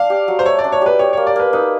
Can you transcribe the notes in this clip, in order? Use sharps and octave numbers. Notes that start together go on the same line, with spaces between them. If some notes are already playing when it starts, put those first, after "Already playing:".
Already playing: D4 F5
G4
F#3
C5
A3 C#5
D5
D4
C#5
G4 B4
G4 C#5
A#3 C#5
D5
A#3 B4
D#4 B4